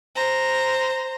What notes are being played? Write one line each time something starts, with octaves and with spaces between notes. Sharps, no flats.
C5 A#5